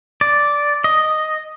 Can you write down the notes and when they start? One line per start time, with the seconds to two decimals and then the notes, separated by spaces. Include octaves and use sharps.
0.21 D5
0.84 D#5